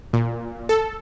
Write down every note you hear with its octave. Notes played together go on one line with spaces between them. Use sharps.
A#2
A4